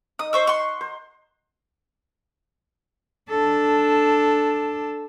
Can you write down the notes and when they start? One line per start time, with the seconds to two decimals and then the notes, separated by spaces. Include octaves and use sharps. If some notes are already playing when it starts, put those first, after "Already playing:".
0.19 D#4 D#6
0.33 C5 C#6 E6
0.47 F#5 C6 C#6
0.81 C5
3.30 D4 A4